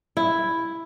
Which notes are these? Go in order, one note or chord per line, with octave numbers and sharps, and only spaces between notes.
E4